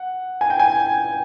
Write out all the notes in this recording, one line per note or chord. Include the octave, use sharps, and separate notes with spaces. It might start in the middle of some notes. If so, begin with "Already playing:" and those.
Already playing: F#5
G#5
G5
G#5